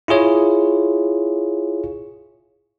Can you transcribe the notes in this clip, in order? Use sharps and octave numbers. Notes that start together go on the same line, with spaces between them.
E4 F4 G#4 C#5